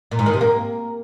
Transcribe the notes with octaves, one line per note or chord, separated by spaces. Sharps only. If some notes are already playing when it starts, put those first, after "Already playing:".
A#2
G#2
D#3
C3
A#3